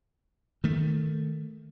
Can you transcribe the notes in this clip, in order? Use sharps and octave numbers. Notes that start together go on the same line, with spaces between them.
D#3 A3